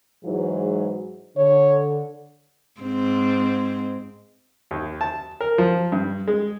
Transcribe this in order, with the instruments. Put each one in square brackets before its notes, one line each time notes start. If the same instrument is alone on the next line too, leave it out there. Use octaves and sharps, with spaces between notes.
[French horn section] G#2 E3 F#3
[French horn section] D3 [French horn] C#5
[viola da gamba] G#2 C4
[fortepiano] D#2
A5
A#4
F3
G2
G#3